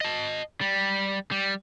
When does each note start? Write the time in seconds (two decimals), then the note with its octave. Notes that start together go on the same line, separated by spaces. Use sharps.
0.01 D#5 A5
0.61 G3
1.31 G3